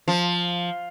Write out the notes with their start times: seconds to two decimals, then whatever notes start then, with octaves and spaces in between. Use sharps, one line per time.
0.08 F3